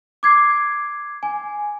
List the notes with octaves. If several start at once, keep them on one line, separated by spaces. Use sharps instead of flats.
D6 G#6 C7
G#5